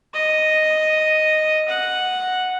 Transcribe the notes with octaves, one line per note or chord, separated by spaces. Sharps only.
D#5
F#5